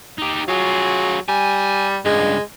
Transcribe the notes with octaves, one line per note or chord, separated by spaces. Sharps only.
D#4 G4
F#3 F4 G#4
G3 G#5
C#2 G2 G#3